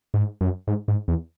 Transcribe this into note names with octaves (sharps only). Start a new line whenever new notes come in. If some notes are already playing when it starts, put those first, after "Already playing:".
G#2
F#2
G#2
G#2
E2